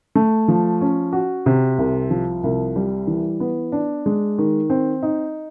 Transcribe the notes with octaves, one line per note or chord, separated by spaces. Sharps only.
A3
F3
C#4
F#4
C3
C2
F3
C2
G3
E3
B3
D4
G#3
D#3
C4
D#4